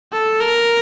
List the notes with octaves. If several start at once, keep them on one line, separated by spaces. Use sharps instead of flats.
A4
A#4